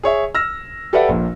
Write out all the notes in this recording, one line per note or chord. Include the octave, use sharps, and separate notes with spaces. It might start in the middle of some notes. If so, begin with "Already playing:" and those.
G#4 C#5 E5
E6 F6 A#6
G4 A4 B4 D5 E5 F#5
A#1 A#2